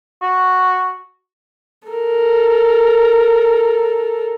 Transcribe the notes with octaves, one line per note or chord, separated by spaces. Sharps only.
F#4
A4 A#4